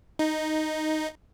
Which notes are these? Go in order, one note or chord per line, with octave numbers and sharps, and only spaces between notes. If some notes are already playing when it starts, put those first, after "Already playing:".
D#4